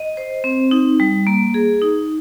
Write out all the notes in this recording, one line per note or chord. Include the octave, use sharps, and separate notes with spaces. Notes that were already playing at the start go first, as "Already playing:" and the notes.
Already playing: D#5
C5
C4
D#4
G3
A#3
G#4
D#4